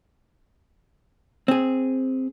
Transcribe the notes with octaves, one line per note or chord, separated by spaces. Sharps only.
C4 G#4